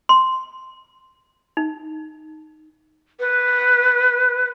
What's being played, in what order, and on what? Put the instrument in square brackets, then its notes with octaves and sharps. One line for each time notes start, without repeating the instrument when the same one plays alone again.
[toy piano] C6
D#4
[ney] B4